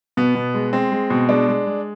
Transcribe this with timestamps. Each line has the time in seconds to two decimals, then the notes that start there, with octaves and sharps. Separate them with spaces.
0.17 B2 B3
0.35 B2
0.54 G#3
0.73 G#3 C4
0.92 G#3
1.10 B2
1.29 G#3 D4
1.48 G#3
1.67 G#3